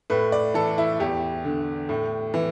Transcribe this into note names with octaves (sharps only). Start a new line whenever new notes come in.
A2 B4
D5
E3 A4
E4
E2 G4
D3
A2
E3